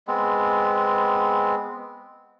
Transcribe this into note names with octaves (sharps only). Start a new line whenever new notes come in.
G#3 B3 C4